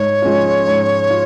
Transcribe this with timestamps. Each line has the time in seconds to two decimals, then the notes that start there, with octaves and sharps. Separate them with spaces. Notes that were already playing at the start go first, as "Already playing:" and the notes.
Already playing: G#2 C#5
0.22 F3 G#3 C#4 F4
0.67 G#2
1.10 F4